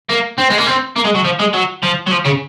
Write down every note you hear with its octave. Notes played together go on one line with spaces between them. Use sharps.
A#3
C4
G#3
A#3
C4
A#3
G#3
F#3
F3
G#3
F#3
F3
F#3
F3
C#3